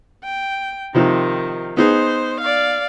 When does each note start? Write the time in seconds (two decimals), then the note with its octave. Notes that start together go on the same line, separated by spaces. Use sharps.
0.24 G5
0.95 C3 D#3 F3 D#4
1.77 B3 D#4 G#4 C5
2.41 D5 F5